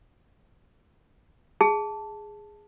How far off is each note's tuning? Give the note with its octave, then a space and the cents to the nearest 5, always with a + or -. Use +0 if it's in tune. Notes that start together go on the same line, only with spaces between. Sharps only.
G#4 +0 A5 +0